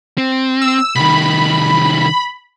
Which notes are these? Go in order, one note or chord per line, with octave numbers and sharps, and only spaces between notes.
C4
E6
C2 D#3 B5